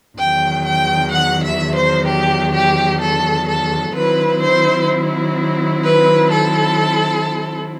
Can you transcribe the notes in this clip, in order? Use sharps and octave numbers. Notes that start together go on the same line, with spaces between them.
E2 D#3 F#3 G5
G5
F#5
E5
C5
G4
G4
A4
A4
D#3 F#3 C4 E4 B4
C5
B4
A4